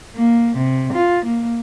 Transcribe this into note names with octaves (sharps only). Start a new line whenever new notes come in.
A#3
C3
F4
A#3